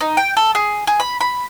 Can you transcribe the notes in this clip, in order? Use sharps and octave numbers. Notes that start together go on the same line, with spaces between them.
D#4
G5
A4
G#4
G#4
B5
B5